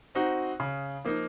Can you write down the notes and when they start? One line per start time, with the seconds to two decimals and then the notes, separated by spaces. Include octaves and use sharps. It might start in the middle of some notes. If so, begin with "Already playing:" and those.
0.15 C4 D#4 F#4
0.60 C#3
1.05 F3 A#3 D#4